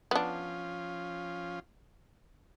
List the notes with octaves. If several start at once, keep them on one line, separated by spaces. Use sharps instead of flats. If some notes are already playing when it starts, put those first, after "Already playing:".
F3 B3 C#4 D4 F4